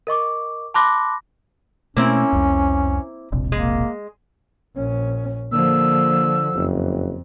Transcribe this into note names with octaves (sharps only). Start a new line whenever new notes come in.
A#4 D#5 C#6 D6
A5 B5 C6 D6 F#6 A#6
B2 A3 A#3 C4 C#4 E4
C2 F2
E1 A#1 C3
G#3 A#3
A#1 C#4
D3 F3 A#3 E6
F#1 F2